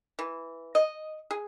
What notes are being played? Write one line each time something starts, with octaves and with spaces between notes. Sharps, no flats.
E3
D#5
G#4